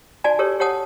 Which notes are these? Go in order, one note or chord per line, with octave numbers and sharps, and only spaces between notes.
D#4 F#4 D5 G#5 A5
G4 A4 A#4 C#5
G4 C#5 F#5 A5 D#6